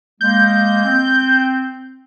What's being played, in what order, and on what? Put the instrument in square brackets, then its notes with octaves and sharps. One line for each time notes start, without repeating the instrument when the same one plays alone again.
[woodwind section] G#3 A#3 [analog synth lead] G6
[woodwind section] C4